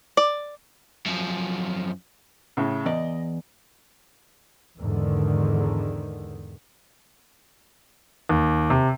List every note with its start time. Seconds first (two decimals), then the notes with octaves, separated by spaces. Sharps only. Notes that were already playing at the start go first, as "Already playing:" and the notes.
0.17 D5
1.06 F#2 F3
2.57 A2 C#3
2.86 E2 D5 D#5
4.77 E2 G#2 D3 D#3
8.29 D#2
8.70 C3